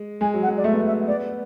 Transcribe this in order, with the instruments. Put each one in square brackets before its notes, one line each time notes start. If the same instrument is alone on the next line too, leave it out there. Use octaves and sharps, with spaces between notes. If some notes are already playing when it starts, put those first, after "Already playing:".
Already playing: [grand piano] G#3
[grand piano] G#3 [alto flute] G#5
[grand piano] F#3
[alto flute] F#5
[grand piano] G#3
[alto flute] D5
[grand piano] A3 [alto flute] E5
[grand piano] B3
A3
[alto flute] E5
[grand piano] B3 [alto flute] D5